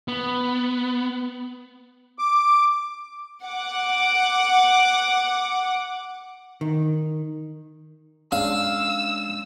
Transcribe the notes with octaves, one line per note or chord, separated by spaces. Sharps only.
B3
D6
F#5 D6
D#3
G#3 C#4 D4 F5 E6